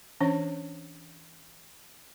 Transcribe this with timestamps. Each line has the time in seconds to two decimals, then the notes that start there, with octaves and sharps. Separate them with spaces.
0.20 E3 C#4 D4 C#5